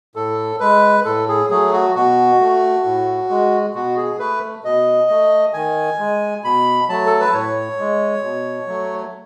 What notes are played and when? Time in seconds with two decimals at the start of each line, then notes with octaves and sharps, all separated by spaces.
0.16 A2 A4
0.60 G#3 B4
1.05 A2 A4
1.28 G#4
1.50 F#3 A3 G#4
1.73 F#4
1.95 B2 F#4
2.40 A3
2.85 A2
3.30 G#3
3.74 B2 F#4
3.97 G#4
4.19 A3 B4
4.64 B2 D#5
5.10 A3
5.53 D#3 G#5
5.99 G#3
6.44 B2 B5
6.89 F#3 A3 A5
7.06 A4
7.20 B4
7.33 A2 C#5
7.79 G#3
8.23 B2
8.67 F#3 A3